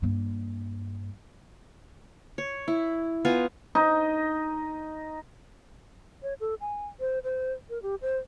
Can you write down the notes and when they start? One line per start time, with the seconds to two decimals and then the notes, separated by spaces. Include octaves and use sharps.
0.02 G2 A#3
2.38 C#5
2.68 E4
3.25 B3 F4 G#5 A#5
3.75 D#4
6.23 C#5
6.40 A4
6.61 G#5
7.00 C5
7.24 C5
7.69 A#4
7.82 G4
8.02 C5